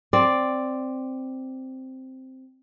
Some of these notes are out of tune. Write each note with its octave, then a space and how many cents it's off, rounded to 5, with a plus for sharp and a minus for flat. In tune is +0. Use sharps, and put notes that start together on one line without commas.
C4 +0 D5 +0